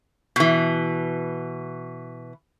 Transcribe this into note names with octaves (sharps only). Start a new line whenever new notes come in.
B2 E3